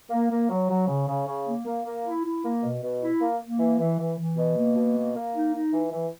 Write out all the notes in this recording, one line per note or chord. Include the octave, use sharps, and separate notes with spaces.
A#3
A#3
F#3
F#3
C#3
C#3
C#3
A#3
A#3
A#3
E4
E4
A#3
B2
B2
E4
A#3
A#3
E3
E3
E3
E3
B2
A#3
B2
A#3
A#3
D#4
D#4
E3
E3